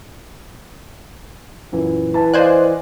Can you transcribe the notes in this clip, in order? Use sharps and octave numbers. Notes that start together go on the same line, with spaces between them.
F#2 A#2 E3
E3 B4 A5
C5 D5 D#5 F5 G#5 F#6